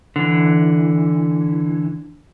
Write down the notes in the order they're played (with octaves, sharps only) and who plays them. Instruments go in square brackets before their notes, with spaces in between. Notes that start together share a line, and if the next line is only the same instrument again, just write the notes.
[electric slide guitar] D3 E3